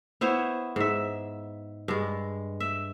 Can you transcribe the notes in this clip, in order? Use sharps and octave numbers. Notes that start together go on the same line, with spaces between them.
B3 E4 C5 C#5
G#2 E5
G2 G#3
E5